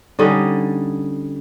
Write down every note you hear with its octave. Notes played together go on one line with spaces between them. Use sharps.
D3 G3 C#4 D#4